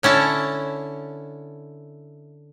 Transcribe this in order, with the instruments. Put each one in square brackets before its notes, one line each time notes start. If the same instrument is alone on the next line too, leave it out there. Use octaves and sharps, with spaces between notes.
[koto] D3 C#4 E4 A5